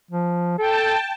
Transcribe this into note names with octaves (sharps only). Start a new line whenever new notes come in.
F3
A4 G5 A5